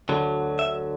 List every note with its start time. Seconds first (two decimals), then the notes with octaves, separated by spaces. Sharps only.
0.09 D2 D3 F#3
0.59 E5